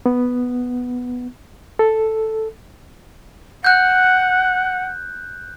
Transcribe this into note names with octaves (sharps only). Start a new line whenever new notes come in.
B3
A4
F#5 F#6 G6